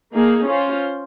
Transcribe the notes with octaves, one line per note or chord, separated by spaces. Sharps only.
A#3 D#4 G#4
C#4 F4 C5